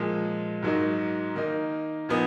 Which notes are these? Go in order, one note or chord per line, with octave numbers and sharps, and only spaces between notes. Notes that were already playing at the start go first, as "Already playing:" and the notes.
Already playing: A#2 F3 G#3
G#2 F#3 A#3 D#4
D#3 A#3 D#4
A#2 F3 B3 D#4